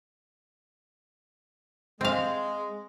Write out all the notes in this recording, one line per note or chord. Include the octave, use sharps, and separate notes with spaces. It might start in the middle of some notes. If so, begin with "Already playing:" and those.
G#3 C4 F5